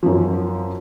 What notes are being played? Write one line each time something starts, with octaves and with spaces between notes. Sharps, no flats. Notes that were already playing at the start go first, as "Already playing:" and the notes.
F#2 F3